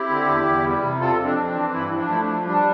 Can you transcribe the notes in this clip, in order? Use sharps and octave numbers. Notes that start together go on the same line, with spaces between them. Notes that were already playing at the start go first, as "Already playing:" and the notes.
Already playing: C4 E4 G4
D3
E2
E2
G3
C3
C4 F4 A4
F2
D4
C4
D4
E3
G2 E4
F3
D4
A3 E4
D4
F3
G3 D4